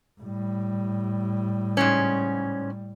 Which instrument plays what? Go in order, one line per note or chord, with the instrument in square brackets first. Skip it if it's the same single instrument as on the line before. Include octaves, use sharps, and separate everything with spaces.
[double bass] A2 G3
[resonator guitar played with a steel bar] G#2 C#3 C#4